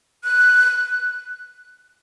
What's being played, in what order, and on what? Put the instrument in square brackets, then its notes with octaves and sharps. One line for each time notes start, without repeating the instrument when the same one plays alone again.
[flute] F#6